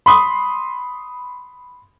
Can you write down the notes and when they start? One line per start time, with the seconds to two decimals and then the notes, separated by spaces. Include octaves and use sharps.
0.06 B5 C6 D#6